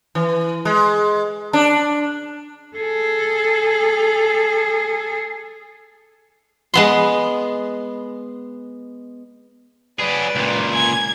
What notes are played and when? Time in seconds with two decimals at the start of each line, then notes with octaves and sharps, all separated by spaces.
0.15 E3
0.65 G#3
1.53 D4
2.77 G#4 A4
6.74 G#3 B3 C6
10.00 F#3 G#4 B4 D5
10.36 C#2 A#2
10.74 G#5 G#6